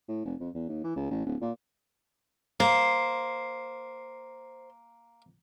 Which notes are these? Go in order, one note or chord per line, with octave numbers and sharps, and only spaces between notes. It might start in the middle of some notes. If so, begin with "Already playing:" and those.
A2
F1
F2
E2
D#2
E3
C#2
A1
D1
A#2
A#3 C5